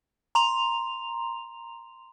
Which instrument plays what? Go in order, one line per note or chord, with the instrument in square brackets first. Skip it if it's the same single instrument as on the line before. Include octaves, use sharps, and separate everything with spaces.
[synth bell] A#5 C6 F7